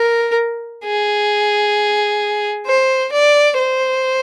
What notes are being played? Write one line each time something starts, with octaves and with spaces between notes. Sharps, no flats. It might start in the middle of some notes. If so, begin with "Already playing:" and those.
Already playing: A#4
G#4
C5
D5
C5